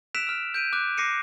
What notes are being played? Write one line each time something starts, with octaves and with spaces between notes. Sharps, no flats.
E6 F#6 B6 D7 E7 F7
E6 F6 E7
G6 D7 D#7
D6 F#6
D6 A#6 C7 C#7 D#7